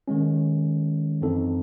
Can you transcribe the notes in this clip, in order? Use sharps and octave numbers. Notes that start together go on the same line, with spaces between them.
D#3 G#3 C#4
F#2 E3 C4 D#4 A4